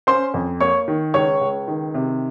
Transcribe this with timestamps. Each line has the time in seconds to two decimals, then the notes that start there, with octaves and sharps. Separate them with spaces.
0.07 C#4 C5 C6
0.34 F2
0.60 A#3 C#5 C#6
0.88 D#3
1.14 C#2 C#5 C#6
1.41 C#2
1.68 D#3
1.94 C3